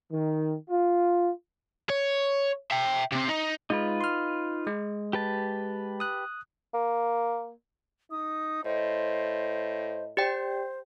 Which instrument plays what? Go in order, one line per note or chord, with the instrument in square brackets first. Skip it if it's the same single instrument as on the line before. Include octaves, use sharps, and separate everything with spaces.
[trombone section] D#3
F4
[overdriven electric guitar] C#5
E5 G5
C3 C4
D#4
[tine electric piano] G#3 [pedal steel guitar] D#4 F4 B4
[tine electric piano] C6 F6
G#3
[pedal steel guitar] G4 B4 A5
[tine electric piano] D#6 F#6
[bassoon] A#3
[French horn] D#4 [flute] D#6
[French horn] A2 [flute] C5 [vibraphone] D#5
[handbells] G4 D5 G5 [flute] C5